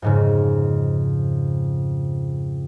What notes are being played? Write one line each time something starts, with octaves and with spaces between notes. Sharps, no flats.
F2 G#2 C#3